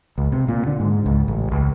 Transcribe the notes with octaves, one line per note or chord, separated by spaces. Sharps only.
C#2
C3
A#2
D3
G#2
C#2
A1
C#2